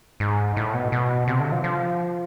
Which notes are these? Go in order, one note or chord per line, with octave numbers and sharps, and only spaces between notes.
G#2
A2
B2
B2
C3
D3
F3
F3